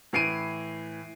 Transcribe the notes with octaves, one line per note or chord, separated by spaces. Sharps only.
A2 E3 C7 D7 D#7